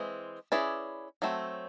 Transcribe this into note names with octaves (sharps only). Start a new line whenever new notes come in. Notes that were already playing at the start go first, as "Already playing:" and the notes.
Already playing: E3 G#3 C4
C#4 E4 G#4 B4 D5
F#3 A3 C4